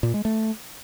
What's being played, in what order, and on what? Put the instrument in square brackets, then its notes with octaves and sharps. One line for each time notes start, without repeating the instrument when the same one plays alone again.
[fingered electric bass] A#2
G#3
A3